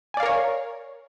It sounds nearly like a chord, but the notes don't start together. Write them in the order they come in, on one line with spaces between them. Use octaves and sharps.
G#5 D5 F5 A#4 C#5